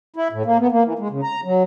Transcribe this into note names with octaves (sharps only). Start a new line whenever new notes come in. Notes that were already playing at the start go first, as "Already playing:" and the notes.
E4
A2
A#3
B3
A#3
E3
G#3
C#3
A#5
F#3